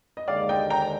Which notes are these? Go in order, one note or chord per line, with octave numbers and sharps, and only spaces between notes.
D#5
D#2 D3 G#3 D5 F5
D#5 G5
G5 A#5